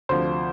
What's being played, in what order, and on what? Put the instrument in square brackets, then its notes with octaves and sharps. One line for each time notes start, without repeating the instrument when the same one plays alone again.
[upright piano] D2 C3 F3 C5